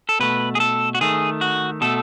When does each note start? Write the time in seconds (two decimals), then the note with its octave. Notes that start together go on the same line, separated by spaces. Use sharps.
0.09 A4
0.20 B2 A3 B4
0.55 G#4
0.60 A4
0.95 F#4
1.01 D#3 A3 G#4
1.41 F#4
1.81 B2 A3 A4